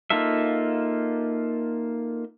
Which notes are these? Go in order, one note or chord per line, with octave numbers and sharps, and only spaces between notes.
A#3 D#4 F4 A4 E5